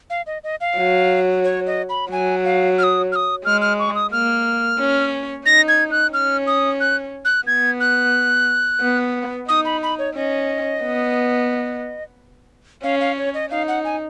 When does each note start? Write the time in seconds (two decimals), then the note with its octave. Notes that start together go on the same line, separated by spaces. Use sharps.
0.10 F5
0.27 D#5
0.44 D#5
0.61 F5
0.77 F#3
1.44 C#5
1.67 D#5
1.89 B5
2.11 F#3 G#5
2.45 F5
2.79 F6
2.83 D#6
3.12 F6
3.16 D#6
3.45 G#3 F6
3.62 F6
3.79 C#6
3.95 D#6
4.12 A#3 F6
4.79 C#4
5.46 D#4 A#6
5.68 G#6
5.91 F#6
6.13 C#4 F6
6.47 D#6
6.80 F#6
7.25 F#6
7.47 B3 G#6
7.80 F#6
8.81 B3
9.49 D#4 D#6
9.65 B5
9.83 B5
9.99 C#5
10.16 C#4 D#5
10.83 B3
12.83 C#4 F5
13.00 F5
13.18 C#5
13.34 D#5
13.51 D#4 F5
13.68 F#5
13.84 G#5